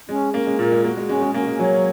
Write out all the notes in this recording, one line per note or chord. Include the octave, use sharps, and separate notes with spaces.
G#3 C#4
A#3 C#4
G#3
A#2 A#4
G#3
A#3 F#4
G#3
G#3 C#4
G#3
A#3 C#4
G#3
F#3 C#5